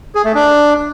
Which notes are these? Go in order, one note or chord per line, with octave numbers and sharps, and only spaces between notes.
G#4
A3
D4